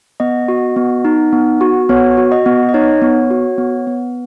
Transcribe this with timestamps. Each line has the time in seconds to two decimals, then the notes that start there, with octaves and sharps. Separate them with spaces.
0.20 B3 D#5
0.48 F#4
0.76 B3
1.05 D#4
1.33 B3
1.61 F#4
1.89 B3 C#5
2.17 F#4
2.32 D#5
2.46 B3
2.69 D#5
2.74 D#4 C#5
3.02 B3
3.30 F#4
3.58 B3
3.87 B3